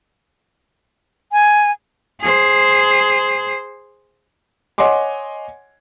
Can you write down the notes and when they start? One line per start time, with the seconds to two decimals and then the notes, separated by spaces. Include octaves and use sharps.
1.32 G#5
2.21 G#4 C5
4.78 C#5 D#5 F#5 G#5 C6 D6